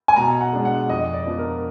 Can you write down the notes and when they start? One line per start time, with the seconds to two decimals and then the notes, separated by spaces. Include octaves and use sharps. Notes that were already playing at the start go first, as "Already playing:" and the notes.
0.08 G#5
0.16 B2 A#5
0.41 F#5
0.53 G#3 D4
0.65 F#5
0.89 F2 D#5
1.13 D5
1.26 F3 B3 D4
1.39 A#4